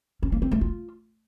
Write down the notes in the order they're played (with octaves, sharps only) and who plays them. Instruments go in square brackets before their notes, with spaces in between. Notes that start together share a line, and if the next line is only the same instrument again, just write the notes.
[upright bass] C#4
A#3
C4
A3
F4